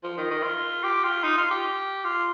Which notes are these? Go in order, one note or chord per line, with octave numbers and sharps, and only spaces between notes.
F3
D#3
D#3
F4
G4
F4
D#4
F4
G4
F4